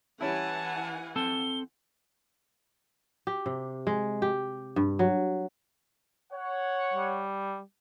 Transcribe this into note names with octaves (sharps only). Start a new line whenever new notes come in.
E3 G3 C#4 E4 F#5 G#5 A5
C4 A4 A5 G7
G4
C3
G#3
G4
G2
F#3
C#5 F#5
G3